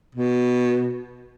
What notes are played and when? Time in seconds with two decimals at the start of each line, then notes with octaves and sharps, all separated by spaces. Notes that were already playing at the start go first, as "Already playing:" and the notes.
0.15 B2